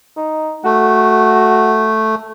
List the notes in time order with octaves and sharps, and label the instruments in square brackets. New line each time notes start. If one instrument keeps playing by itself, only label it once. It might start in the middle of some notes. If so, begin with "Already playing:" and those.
[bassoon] D#4
[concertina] A3 [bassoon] F#4